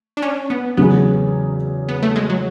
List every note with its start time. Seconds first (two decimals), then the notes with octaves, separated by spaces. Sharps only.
0.17 D4
0.22 C#4
0.50 B3
0.77 E2 C#3 F#3 B3 C#4 G#4
1.89 B3
2.02 A3
2.16 G#3
2.30 F#3